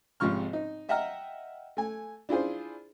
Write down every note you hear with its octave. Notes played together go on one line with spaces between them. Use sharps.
G#1 G#2 C3 F3 C#6 F6
D#4
D#5 E5 F#5 G5 A#5 F6
A3 G#5
D4 E4 F4 G#4 C5